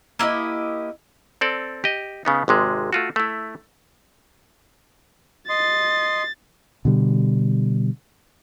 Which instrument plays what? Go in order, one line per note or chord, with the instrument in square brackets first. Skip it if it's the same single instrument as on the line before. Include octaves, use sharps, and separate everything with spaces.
[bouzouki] A#3 E4 G4 D#5
[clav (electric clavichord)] C4 A4 D5
G4 D#5
C#3 B3 D#4
G#1 C3 G#3
A3 F4 F#4
A3 E4
[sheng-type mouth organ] D#5 C6 [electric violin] A6
[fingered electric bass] B2 D3 G3